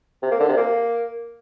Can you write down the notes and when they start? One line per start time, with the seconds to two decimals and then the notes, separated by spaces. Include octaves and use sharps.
0.23 C3
0.31 A#3
0.40 D3
0.49 C3
0.57 A#3